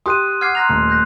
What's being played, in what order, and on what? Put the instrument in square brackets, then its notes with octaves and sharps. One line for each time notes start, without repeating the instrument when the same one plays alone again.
[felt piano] G4 C6 [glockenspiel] D#6 F#6 D#7
[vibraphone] F#5 D6 [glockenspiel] F6 G#6 C7
[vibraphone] A#5 C6 [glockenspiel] F#6 A#6 F7
[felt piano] D#1 [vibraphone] A3 [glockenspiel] C6
[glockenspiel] F#6 G6 A#6